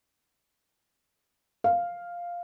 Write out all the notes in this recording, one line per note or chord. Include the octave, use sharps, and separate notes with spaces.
F5